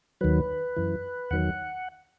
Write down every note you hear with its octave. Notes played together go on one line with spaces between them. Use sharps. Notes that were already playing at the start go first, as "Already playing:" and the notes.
D#2 D#3 F#3 B4
F#2 E3
E2 D#3 F#3 F#5